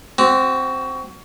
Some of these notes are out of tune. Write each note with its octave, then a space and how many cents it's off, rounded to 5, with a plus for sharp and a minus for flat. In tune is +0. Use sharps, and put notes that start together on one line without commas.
C4 +0 F#4 +20